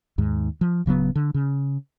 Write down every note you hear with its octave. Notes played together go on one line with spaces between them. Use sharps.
D#2 G#2
F3
D1 C#3 F#3 B3
D3
C#3